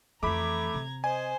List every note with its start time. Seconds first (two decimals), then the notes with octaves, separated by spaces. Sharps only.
0.23 F2 E3 A3 A#5 B5 D6 G#6
0.74 C3
1.04 C5 D#5 G#5